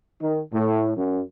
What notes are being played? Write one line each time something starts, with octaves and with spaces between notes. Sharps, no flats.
D#3
A2
F#2